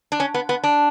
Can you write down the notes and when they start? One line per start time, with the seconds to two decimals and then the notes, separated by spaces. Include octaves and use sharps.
0.12 D4
0.20 C#4
0.34 B3
0.49 B3
0.64 D4